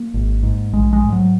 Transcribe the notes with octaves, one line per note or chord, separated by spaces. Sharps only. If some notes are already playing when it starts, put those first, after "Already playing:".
Already playing: A#3
G#1
G#2
A#1 G#3
G#3
G#2
F#3